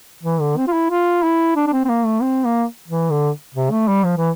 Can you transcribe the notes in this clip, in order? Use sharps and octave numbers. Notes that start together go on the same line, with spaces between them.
E3
D3
C4
F4
E4
F4
E4
D4
D4
C4
C4
A#3
A3
C4
A#3
E3
D3
C3
A3
G3
F3
E3